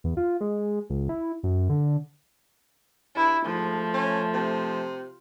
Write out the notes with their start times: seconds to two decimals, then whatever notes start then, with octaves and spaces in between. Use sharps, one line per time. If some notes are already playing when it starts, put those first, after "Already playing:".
0.04 E2
0.17 F4
0.41 G#3
0.90 C#2
1.09 E4
1.43 F#2
1.69 D3
3.16 G2 E4
3.46 G#2 F3 A3
3.94 C#4
4.33 C3